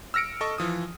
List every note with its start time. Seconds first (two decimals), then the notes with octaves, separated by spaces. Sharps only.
0.14 E6 F6 A#6 C#7 D7
0.41 A4 D#5 C#6
0.58 E3 F3 D#6